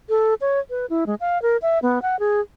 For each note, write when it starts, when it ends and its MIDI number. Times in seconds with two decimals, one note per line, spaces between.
0.09 0.34 69
0.41 0.59 73
0.70 0.86 71
0.90 1.04 64
1.06 1.15 56
1.20 1.41 77
1.42 1.57 70
1.62 1.79 76
1.82 2.02 59
2.02 2.19 78
2.19 2.40 68